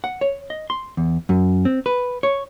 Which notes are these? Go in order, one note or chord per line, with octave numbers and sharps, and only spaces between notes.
F#5
C#5
D#5
C6
E2
F#2
C4
B4
C#5